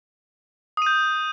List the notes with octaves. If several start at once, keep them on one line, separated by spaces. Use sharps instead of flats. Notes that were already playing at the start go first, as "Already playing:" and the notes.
D#6 G6 D#7